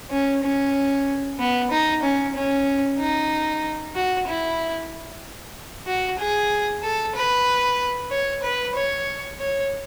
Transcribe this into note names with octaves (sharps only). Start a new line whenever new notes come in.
C#4
C#4
B3
D#4
C#4
C#4
D#4
F#4
E4
F#4
G#4
A4
B4
C#5
B4
C#5
C#5